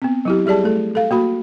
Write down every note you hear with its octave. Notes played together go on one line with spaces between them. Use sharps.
B3 C4
F#3 E4 G4
G3 G4 G#4 D5 A5
A3 A4
A4 F5
A#3 F#4 B5